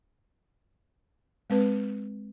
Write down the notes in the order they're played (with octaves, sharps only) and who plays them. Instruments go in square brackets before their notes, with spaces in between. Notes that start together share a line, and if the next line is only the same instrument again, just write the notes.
[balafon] G#3 C4 B4